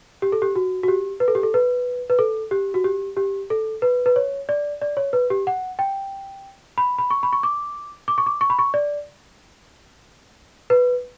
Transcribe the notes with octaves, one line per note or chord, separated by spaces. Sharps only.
G4
A4
G4
F#4
F#4
G4
B4
A4
G4
A4
B4
B4
A4
G4
F#4
G4
G4
A4
B4
B4
C#5
D5
D5
C#5
B4
G4
F#5
G5
B5
B5
C#6
B5
C#6
D6
D6
C#6
D6
C#6
B5
C#6
D5
B4